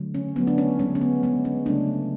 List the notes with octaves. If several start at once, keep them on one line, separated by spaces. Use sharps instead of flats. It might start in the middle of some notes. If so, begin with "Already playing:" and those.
Already playing: D3 F#3 A3
C#4
D3 F#3 A3 B3
D4
C#4
D3 G#3 C#4
C#4
B3
D3 G#3 B3
C#4
C#3 F#3 A3 D4